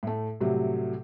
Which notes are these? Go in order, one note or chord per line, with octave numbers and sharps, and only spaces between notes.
A2 A3
A2 C3 F#3 G3